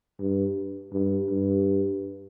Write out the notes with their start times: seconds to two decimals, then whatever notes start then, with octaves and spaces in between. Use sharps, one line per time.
0.20 G2
0.93 G2
1.30 G2